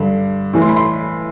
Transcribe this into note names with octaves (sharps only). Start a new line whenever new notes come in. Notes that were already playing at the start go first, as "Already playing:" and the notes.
Already playing: G2 D3
A2 E3
C6
B5
C6